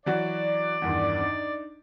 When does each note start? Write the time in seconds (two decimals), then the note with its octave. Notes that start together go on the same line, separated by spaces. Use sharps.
0.06 E3 F#3 F#4 D5
0.82 E2 G2 D#3
1.20 D4 D#4